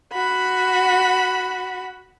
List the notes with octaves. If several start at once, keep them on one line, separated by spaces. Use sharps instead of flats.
F#4 B5